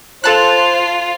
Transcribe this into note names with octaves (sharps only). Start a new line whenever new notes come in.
F4 A4 C5 A5 F#6